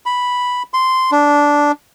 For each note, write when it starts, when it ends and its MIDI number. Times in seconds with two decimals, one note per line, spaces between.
0.06 0.63 83
0.74 1.11 84
1.12 1.72 62